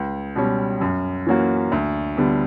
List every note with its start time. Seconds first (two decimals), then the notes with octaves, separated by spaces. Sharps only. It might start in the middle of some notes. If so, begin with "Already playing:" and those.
Already playing: C#2
0.36 B2 G3 C#4
0.81 F#2
1.26 E3 A#3 C#4 F#4
1.72 D2
2.17 D3 G3 B3